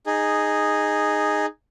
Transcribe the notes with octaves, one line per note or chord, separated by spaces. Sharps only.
D#4 G#4